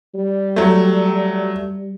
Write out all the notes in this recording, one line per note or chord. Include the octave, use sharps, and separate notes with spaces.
G3
F#3 A3